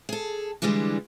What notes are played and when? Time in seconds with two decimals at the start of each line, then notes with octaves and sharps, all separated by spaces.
0.09 G#4 A4
0.62 D3 E3 G3 G#3 D4